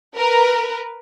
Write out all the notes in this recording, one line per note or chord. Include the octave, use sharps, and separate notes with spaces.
A#4 B4